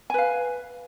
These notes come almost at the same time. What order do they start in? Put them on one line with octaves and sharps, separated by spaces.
G#5 B4 F5